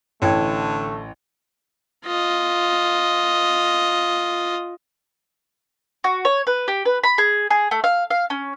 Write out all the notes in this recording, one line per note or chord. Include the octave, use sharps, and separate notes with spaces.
A1 D3 A3 C#5 G5 G#6
F4 D#5
F#4
C#5
B4
G4
B4
B5
G#4
G#4
A3
F5
F5
C#4